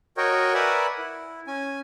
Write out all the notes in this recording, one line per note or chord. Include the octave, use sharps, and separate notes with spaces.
F#4 A#4 C#5 D#5 G5
A#4 B4 D5 E5 F#5 G#5
E4
C#4 G#5